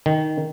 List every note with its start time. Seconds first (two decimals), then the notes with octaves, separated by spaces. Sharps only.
0.06 D#3